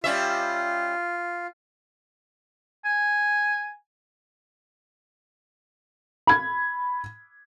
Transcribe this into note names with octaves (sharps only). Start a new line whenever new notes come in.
G3 C#4 F4 E5
G#5
B5 G#6